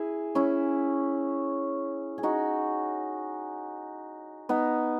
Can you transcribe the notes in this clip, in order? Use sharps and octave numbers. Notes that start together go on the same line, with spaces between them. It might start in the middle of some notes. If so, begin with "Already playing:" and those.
Already playing: E4 G#4
C#4 E4
G#4
D#4 F#4
B3 D#4